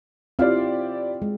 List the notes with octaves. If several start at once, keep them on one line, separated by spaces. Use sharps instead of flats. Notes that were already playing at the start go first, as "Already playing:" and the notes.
C4 E4 F4 G4 D5 F5
G#3